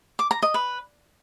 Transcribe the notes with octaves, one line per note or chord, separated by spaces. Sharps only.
D6
A#5
D#5
B4